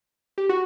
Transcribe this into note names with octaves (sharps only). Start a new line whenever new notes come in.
G4
F#4